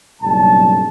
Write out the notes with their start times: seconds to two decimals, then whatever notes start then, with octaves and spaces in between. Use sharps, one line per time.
0.21 F#1 B1 G2 G3 A5